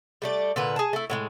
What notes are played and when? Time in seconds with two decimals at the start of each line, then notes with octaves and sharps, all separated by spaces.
0.22 G3 A3 D5
0.56 A#2 D3 B4
0.76 G#4 A5
0.93 A3 E4
1.10 A2 F3 G#3